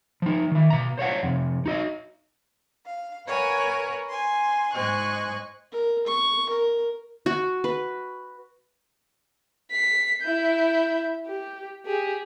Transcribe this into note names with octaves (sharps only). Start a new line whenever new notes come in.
F3 D#4
D#3 E5
B2 A#5
C5 C#5 F5 F#5
F2 C3
D#4 F#4 D#5
F5
A#4 B4 C#5 F#5 G#5
G#5 C6
G#2 C5 D#5 G#5 C#6 F#6
A#4
C#6
A#4
F#4
B4
B6 C7
E4 G6
G4
G4 G#4